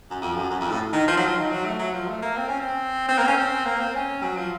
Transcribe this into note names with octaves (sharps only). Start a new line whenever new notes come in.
F#2
F2
F#2
F#2
F2
A2
D#3
F3
F#3
F3
D#3
F#3
A3
F#3
F3
A3
A#3
C4
C#4
C4
C4
A#3
C4
C#4
C4
A#3
C4
C#4
F#3
F3